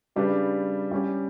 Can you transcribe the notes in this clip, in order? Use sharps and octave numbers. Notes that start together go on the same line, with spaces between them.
C#3 G3 D4 G4 B4
G3 C#4 G4